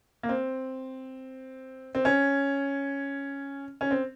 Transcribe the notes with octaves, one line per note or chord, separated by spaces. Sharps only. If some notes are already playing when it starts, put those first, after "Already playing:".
A#3
C4
C4
C#4
C#4
C4